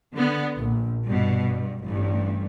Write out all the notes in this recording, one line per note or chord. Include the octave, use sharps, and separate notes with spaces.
D3 B3
A#1
G2 B2
G2
A1 G2